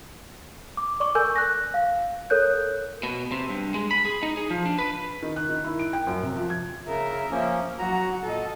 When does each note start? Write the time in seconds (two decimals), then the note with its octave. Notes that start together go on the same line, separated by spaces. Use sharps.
0.77 D6
1.00 D5 C#6 D6
1.15 A4 A#4 G#5 C#6 E6 G6
1.36 F#6 A#6
1.74 F5
2.30 A4 A#4 C#5 F#6 G6
3.03 B2
3.32 C3
3.49 G2
3.74 G#3
3.91 B5
4.05 G#4
4.23 D#4
4.37 G#4
4.50 F3
4.65 D4
4.79 B4
5.23 D#3
5.36 F#6
5.49 D#3
5.64 E4
5.79 D7
5.93 G5
6.07 F#2
6.23 C3
6.36 F3
6.50 G#6
6.87 C#3 A#4 E5
7.31 F3 A#3 C#4
7.79 F#3 F#4 A#5
8.24 A#2 A4 D#5